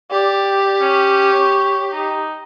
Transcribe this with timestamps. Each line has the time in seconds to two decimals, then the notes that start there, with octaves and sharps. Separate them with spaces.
0.11 G4 D5
0.81 C#4
1.31 C#5
1.92 D#4